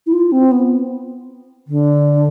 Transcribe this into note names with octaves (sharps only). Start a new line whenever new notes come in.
E4
F4
C4
B3
D3